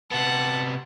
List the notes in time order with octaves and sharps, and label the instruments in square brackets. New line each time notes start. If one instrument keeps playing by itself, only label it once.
[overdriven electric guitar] C3 B3 [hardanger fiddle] F#5 [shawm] A5